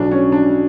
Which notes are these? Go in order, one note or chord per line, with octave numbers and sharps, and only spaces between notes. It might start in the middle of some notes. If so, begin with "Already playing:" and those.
Already playing: B1 B2 F#3 D4
C#4
D4